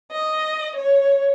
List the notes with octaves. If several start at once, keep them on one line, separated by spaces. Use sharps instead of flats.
D#5
C#5